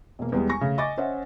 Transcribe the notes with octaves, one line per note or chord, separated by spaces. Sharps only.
E1 A#3
E2 G3 G#3
G#5 C#6 A#6
C#3 A3
D#5 G#5 C#6 D6 A6
C#4 C5 D#5 E5 F#5